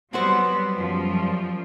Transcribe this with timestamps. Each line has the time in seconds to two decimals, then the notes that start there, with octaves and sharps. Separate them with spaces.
0.13 F#3 G3 B3 C4 F#4 C5
0.77 F#2 F3 G3